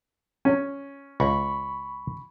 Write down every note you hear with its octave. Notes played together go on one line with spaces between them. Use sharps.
C#4
C#2 B5 C#6